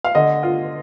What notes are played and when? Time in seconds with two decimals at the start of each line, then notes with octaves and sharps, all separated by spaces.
0.04 F5
0.15 D3 D#5
0.43 F4